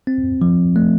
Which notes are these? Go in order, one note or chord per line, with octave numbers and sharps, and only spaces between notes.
C4
F3
A3